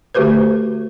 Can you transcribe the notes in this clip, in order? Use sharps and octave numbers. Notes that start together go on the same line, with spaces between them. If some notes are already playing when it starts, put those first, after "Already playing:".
D3 A3 F#4 G4 B4 C5